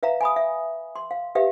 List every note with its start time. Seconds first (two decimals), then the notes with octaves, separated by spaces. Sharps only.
0.03 B4 E5 F5 A#5
0.21 G#5 B5 D#6
0.36 E5
0.96 C6
1.11 F5
1.35 G4 B4 E5 F5